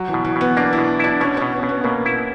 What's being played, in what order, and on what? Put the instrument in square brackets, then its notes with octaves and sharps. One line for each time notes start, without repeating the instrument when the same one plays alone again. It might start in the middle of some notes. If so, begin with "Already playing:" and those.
Already playing: [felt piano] F#3
E3
[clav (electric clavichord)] B2
[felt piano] E3
[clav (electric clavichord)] B2 [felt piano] B3
[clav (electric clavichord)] A#3 [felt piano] D4
[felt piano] E4
[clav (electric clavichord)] B2
[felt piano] D4 [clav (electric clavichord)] E4
[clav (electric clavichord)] B2 [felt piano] C#4
[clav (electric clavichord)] B2 [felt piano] C#4
[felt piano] B3
[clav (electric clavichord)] B2
[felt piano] B3
[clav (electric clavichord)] B2 [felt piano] A#3
[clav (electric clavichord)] E4